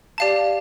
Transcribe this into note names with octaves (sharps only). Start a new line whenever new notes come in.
G4 D5 F5 A5